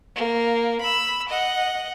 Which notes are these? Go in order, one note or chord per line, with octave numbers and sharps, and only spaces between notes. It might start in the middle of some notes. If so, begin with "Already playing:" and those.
A#3
B5 E6
D#5 F#5